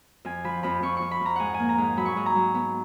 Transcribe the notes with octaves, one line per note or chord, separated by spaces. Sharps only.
F2 G#5
F3 B5
F2 B5
F2 C#6
C#6
F2
B5
F2 A#5
G#2 F#5 G#5
G#5
A#3
A#5
G#2
G#5
F#3 B5
C#6
G#2 B5
A#5
F#3
B3